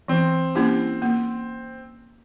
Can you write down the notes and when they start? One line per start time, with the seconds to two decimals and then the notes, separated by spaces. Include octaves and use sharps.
0.08 E3 C4
0.55 A#3 C#4 E4 G4
1.02 A#3